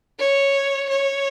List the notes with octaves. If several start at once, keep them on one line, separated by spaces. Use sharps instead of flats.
C#5
C#5